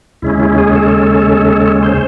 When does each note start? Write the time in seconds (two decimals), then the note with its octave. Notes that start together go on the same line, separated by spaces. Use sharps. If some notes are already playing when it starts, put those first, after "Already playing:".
0.22 D#2 C#3 G#3 C#4 E4
0.40 E4
0.58 G#4
0.75 A4
1.83 C5